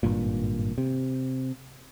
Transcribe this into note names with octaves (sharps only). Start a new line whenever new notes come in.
G#1 G2 A#2
C3